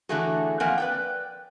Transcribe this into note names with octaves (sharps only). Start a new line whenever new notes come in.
D3 E3 F#3 A3 F#4 G#4
F3 A#3 C4 A#4 F#5 G#5
B4 D5 G5